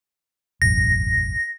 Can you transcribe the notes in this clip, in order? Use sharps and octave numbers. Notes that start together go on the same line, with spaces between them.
E1 A1 F#2 A#6